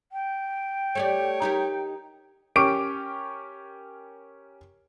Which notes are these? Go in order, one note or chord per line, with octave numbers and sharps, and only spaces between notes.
G5
A3 G4 C#5 D5
D#4 G4 A#4
C#4 G4 A#4 C#6 D6 D7